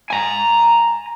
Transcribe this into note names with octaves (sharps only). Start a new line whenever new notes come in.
G#5 A#5